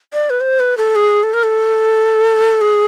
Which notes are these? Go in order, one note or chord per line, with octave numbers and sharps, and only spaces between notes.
D5
B4
C5
B4
A4
G#4
A4
A#4
A4
G#4